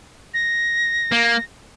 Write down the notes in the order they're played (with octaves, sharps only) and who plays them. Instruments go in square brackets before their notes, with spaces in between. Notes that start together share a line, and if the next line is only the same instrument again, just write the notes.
[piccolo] A#6
[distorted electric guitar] A#3